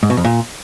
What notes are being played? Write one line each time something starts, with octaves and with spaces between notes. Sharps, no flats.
G#2
B2
F2
A#2